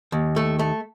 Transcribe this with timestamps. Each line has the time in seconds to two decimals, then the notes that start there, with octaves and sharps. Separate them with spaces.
0.12 D#2
0.36 A3
0.59 A3